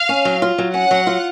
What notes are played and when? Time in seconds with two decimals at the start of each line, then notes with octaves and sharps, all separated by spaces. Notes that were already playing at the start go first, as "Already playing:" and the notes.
Already playing: F5
0.09 C#4
0.25 F#3
0.42 F4
0.58 F#3
0.74 C#4 F#5
0.91 F#3
1.07 F4